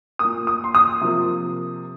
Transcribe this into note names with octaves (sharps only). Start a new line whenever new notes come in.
A#2 A#3 D#6
D#6
C6
D#6
C3 F3 A#3